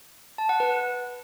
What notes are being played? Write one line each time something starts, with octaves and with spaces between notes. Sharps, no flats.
A5
F#5
B4